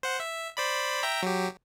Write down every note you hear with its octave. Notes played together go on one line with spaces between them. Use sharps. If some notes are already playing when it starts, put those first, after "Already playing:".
C5 F#5
E5
C5 D5 B5
E5 G5 A#5
F#3 G4